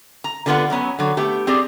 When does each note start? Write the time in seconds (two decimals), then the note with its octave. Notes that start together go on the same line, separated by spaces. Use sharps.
0.24 A#5
0.46 D3 G3 B3 F4 B4 F#5
0.70 D3 F#3 B3 C#4
0.99 D3 F#3
1.17 A3 B3 G4
1.47 C4 G4 G#4 D5